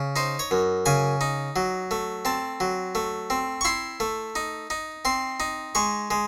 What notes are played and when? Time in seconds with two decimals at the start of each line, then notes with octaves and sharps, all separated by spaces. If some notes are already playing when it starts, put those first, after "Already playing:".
Already playing: C#3
0.16 D#4 C5
0.39 C#5
0.51 F#2
0.86 C#3 G#5
1.21 D#4
1.56 F#3
1.91 A3
2.25 C4 A5
2.60 F#3
2.95 A3
3.30 C4
3.61 C#6
3.65 E4 C6
4.00 A3
4.36 D#4
4.70 D#4
5.05 C4 C6
5.40 D#4
5.75 G#3 C#6
6.11 G#3